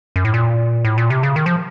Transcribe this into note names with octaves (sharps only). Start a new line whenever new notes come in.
F#2
A2
A#2
A2
A#2
C3
C#3
D#3
F3